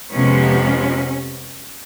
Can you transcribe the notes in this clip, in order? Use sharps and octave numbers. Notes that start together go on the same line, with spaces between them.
F2 C3 F3 G#3 B3 C#4